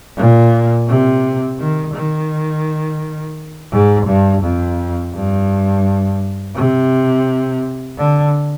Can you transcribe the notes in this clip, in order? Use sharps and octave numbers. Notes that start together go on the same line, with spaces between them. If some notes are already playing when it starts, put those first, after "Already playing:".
A#2
C3
D#3
D#3
G#2
G2
F2
G2
C3
D3